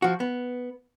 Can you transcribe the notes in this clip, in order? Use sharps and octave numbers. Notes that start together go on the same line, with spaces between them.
F3 F#4
B3